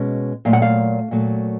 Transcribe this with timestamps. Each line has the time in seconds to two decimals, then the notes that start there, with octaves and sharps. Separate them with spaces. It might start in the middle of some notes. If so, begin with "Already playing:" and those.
Already playing: B2 G#3 C#4
0.45 A#2 F#3 A3 F5
0.53 F#5
0.62 F5
1.11 A#2 F#3 A3